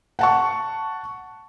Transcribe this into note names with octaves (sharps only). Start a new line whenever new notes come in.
F#5 A5 C#6